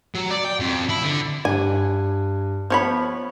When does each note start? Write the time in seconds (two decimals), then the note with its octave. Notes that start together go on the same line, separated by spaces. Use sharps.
0.15 F#3
0.31 D5
0.45 G5
0.60 F2
0.89 E4
1.03 D3
1.45 G2 G#5
2.70 F3 B3 C#5 B5